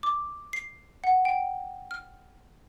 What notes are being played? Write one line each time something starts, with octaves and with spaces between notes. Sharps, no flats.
D6
C7
F#5
G5
F6